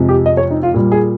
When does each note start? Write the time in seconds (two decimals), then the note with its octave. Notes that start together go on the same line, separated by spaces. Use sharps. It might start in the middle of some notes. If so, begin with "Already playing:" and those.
Already playing: F2 C3 F3 G#3
0.09 G4
0.26 D#5
0.37 C#5
0.51 D#4
0.63 F4
0.74 A#2 G3
0.92 G#4